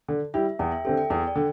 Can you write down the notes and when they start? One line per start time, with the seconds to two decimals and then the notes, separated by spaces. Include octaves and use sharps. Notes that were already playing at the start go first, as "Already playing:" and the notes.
0.08 D3
0.34 G3 E4 G4 E5
0.59 E2 G5
0.72 E5
0.85 D3 C4 G4 A4
0.97 G5
1.10 E2 G5
1.27 D5
1.36 D3